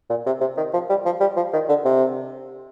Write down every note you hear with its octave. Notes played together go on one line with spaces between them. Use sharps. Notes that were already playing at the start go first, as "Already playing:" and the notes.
A#2
C3
C3
D#3
F3
G3
F3
G3
F3
D#3
D3
C3